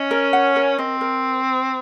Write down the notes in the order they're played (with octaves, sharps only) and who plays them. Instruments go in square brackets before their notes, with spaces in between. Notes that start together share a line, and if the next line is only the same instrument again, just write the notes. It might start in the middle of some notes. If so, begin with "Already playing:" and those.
Already playing: [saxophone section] C#4 [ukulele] D#5
[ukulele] A#4
F#5
A#4
[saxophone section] C4 [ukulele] D#5
[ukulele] A#4